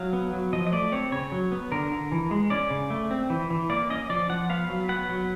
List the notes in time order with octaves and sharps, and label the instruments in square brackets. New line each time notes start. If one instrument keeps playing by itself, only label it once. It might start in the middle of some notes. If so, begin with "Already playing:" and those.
Already playing: [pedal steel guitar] F#3 F5
B3
F#3
F3 D#5
D#5
A3 D5
C4 C#5
C#3 C#5
F#3
B3
D3 A#4
D3
E3
G#3
C#4 D5
C#3
A3
C4
E3
E3
A#3 D5
C#4 D#5
F3 D5
F3 F#5
B3 F5
F#3
B3 F#5
F#3